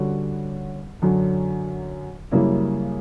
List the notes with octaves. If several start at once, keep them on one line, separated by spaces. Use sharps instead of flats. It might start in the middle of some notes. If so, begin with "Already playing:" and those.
Already playing: D3 G3 C#4 F#4
F#2 D3 F#3
F#2 C#3 G3 A#3 E4